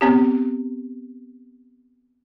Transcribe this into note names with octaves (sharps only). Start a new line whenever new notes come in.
B3 C4 G4